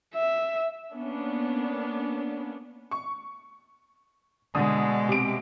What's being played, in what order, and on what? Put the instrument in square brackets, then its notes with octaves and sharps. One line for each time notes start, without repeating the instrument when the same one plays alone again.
[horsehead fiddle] E5
[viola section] A#3 B3 C#4 D4
[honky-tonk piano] C#6
[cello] B2 G#3 [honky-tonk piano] D3 D#6
[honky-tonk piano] C3 D7